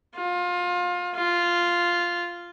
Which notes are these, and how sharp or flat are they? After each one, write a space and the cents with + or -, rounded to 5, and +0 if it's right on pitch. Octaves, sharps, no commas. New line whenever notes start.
F4 +25
F4 -5